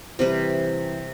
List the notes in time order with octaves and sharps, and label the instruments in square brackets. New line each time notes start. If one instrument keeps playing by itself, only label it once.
[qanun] C3 G3 B4 [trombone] E3